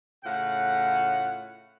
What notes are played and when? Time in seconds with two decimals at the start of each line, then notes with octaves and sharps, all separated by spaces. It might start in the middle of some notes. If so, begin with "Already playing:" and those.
0.25 A2 C#3 F4 F#5